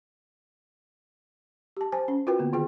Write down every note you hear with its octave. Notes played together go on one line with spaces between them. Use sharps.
G4 A5
C5 G#5 A5
C#4
F4 F#4 A#4 B4 G5
D3 A#3 B3
D#3 F4 G#4 G5